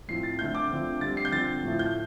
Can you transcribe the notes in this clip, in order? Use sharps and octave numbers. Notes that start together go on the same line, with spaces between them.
A2 F3 C4 C7
A6
D3 A3 C4 G6
D6
D3 F3 A3 C4
D3 G3 C4 A6
C7
G6
D3 F3 C4 A6
A2 F3 A3
G6